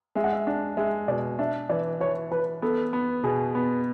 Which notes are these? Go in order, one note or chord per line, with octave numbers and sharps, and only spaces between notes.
G#3 E5
F#5
E5
D4
G#3 E5
B2 D5
D4 E5
E3 D5
E3 C#5
E3 B4
B3 A4
B3
B2 G#4
B3